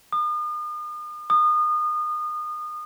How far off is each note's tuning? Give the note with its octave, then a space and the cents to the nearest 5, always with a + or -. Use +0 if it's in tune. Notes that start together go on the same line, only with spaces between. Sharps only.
D#6 -40
D#6 -30